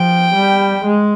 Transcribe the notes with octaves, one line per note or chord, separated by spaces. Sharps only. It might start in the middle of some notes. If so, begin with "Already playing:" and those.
Already playing: F3 G5
G3
G#3